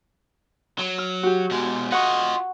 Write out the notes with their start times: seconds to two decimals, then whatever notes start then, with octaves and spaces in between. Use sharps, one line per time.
0.79 F#3
0.98 F6
1.23 F#4 G4
1.51 B2 G#3
1.92 F4 D#5 F#5 C#6